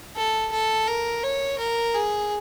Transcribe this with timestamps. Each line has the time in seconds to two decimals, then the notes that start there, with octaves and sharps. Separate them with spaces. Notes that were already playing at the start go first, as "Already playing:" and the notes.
0.16 A4
0.52 A4
0.88 A#4
1.23 C#5
1.59 A#4
1.94 G#4